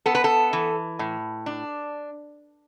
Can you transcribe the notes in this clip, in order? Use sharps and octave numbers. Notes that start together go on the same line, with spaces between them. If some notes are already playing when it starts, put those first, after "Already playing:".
B3 A4
B4
A4
E3
A2
D4